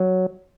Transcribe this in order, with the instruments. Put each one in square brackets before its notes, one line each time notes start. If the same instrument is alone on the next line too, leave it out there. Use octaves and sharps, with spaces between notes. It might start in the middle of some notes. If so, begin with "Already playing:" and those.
Already playing: [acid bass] F#3